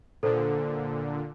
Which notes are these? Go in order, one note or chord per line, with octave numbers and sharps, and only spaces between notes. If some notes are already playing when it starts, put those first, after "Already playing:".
A#2 D3 A4 C5